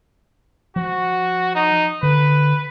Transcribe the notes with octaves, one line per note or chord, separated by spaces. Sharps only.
F3 F#4
D#4
D3 B4